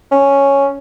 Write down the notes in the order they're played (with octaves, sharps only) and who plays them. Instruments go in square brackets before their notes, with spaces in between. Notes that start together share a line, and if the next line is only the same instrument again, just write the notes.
[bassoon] C#4